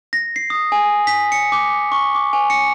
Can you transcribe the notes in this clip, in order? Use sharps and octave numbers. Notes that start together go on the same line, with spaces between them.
A#6
C7
D#6
G#5
B6
C#7
D6
C#6
D6
G#5
C#7